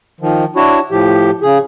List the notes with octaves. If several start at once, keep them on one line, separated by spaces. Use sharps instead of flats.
D#3 F3
D4 E4 F#4 C#5
A2 F3 G4
C#3 G#4